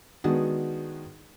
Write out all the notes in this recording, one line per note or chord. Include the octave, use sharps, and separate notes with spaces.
D#3 G#3 B3 D4 F#4 G#4